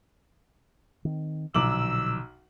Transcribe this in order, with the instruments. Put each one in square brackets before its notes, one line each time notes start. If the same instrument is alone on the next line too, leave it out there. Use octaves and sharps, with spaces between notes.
[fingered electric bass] D#3 C4
[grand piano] B1 D6 F#7 [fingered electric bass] A#2 D3 F3 [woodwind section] E6